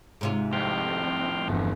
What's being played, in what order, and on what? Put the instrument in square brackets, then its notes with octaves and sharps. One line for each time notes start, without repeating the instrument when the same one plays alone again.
[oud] G#2 C3 F4
[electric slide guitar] F2 A2 [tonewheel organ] G5 C6 F6
[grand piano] G1 E2